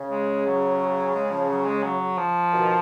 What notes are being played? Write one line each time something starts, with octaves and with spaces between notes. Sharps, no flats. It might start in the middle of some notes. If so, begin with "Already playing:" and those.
Already playing: C#3
G#3
F#3
G#3
F3
F#3
G#3
F#3
F3
B2 D#3